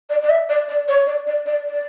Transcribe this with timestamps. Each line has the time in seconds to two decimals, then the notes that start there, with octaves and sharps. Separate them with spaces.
0.10 D5
0.23 D5
0.29 E5
0.49 D5
0.69 D5
0.88 C#5
1.07 D5
1.27 D5
1.46 D5
1.66 D5